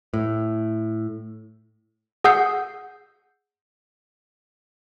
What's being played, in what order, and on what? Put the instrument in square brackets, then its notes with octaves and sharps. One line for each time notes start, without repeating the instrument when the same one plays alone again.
[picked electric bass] A2
[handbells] G#4 F#5 D#6 E6 G6 C7